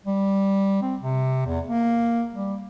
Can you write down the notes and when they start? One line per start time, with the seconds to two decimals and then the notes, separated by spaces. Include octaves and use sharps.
0.06 G3
0.82 C4
1.02 C3
1.46 E2
1.69 A#3
2.34 G3